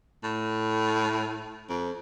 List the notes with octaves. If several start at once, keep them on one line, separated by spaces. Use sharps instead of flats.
A2
F2